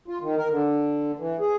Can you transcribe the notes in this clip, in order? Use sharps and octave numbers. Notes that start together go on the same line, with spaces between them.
F4
D#3
A#4
D3
E3
G#4